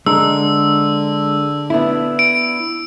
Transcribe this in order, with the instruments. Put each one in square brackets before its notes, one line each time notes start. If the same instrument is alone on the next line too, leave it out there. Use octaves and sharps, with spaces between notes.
[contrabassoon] D3 [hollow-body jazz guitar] G#3 A#4 [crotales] E6
[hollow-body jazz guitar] B3 D4 E4
[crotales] D7